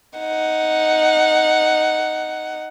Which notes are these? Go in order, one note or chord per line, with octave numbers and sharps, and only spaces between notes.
D#4 F#5